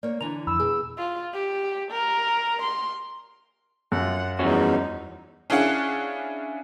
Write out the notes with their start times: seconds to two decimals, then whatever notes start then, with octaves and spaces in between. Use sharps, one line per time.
0.03 A#3 C#5 D5
0.21 D3 E3 A#5 F7
0.47 F2 B5 E6
0.60 B2 G#4
0.98 F4
1.34 G4
1.92 A#4
2.62 C6
3.92 F#2 F4 F#5
4.39 E2 F3 G3 C#4 D#4 F#4
5.50 C#4 D4 E4 G#4 F5 F#5